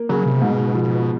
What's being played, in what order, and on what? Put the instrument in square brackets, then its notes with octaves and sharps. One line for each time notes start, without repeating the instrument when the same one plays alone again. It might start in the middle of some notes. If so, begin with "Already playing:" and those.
Already playing: [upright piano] A#3
[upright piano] C#3 [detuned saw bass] F#3
[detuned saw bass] C3
[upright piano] G#2 [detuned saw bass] B2
[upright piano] F3